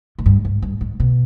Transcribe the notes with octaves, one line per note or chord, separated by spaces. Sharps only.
G#2
G2
G#2
G2
G#2
B2